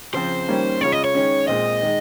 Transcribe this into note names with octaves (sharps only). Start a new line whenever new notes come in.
C#3 F3 C4 C5
D#3 G3 A#3 C#4
C#3 G#3 C#4 F4 C#5
D#5
C#5
D#3 G#3 C#4
A#2 G#3 C4 D#5
D#3 G#3